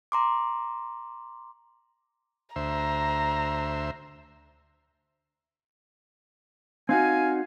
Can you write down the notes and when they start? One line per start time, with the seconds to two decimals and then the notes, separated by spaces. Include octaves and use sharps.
0.12 A#5 C6 D6
2.56 D2 C5 E5 A#5
6.89 C4 D#4 F#4 F5 G#5